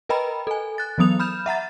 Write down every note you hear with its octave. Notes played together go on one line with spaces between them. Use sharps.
A#4 B4 D#5 G5 A#5 B5
A4 G#5
F#6 A6
E3 F#3 B3 D#6 F7
B5 F6 G6 E7
E5 F#5 A#5 A6